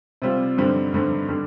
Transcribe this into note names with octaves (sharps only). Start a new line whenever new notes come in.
C3 G3 C4 F4
G2 D3 G3 C4 D#4
G2 D3 G3 C4 D#4
D3 G3 D4